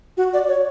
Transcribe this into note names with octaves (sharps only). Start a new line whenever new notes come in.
F#4
D5
C#5